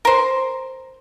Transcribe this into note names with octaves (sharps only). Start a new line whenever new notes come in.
A#4 C5